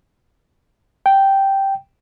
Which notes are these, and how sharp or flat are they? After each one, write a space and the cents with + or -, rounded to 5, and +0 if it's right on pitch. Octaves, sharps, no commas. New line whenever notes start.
G5 -5